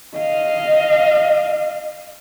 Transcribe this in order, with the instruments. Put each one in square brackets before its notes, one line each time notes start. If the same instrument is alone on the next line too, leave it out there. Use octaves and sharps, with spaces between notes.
[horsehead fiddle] D#5 F5